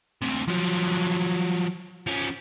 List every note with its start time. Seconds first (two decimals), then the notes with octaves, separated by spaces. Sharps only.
0.22 D2 C3
0.48 F3 F#3
2.07 F3 C#4